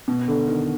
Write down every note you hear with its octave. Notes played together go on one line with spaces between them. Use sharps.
B2
D3
D#3